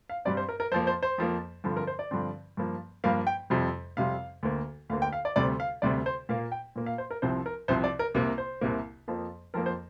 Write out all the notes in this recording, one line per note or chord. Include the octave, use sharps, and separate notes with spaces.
F5
G2 G3 C4 D5
C5
A#4
A#4
F2 F3 A#3 C5
C5
C5
F2 F3 A#3
G2 D3 F3 C4
A#4
C5
D5
G2 D3 F3 C4
G2 F3 A#3
G2 F3 A#3 F5
G5
F2 C3 G3 C4
F2 C3 G3 C4 F5
D2 D3 A#3
D2 D3 A#3 F5
G5
F5
D5
D2 C3 G3 C4 D5
F5
D2 C3 G3 C4 D5
C5
A#2 A#3 F5
G5
A#2 A#3
F5
C5
A#4
C2 C3 F3 C4 C5
A#4
C2 C3 F3 C4 C5
D5
A#4
C2 C3 A#3
C5
C2 C3 A#3
F2 F3 A#3
F2 F3 A#3 A#4
C5